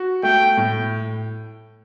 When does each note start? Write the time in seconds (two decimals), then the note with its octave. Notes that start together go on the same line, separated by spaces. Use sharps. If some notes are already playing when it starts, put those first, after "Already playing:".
Already playing: F#4
0.23 A3 G5
0.57 A2